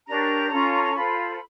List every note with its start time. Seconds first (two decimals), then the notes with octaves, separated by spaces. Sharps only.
0.07 D4 G4 A#4 C#5 A#5
0.50 C#4 F4 A4
0.83 A#5
0.94 F4 A4 C5 B5